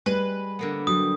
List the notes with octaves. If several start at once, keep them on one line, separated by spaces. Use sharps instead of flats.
G3 G#3 B4
D3 A#3 B3
F#3 G3 D#6